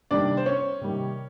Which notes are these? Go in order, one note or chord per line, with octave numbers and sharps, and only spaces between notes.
C3 D#3 G3 A#3 D4 D5
C5
C#4 C#5
C3 D#3 G3 A#3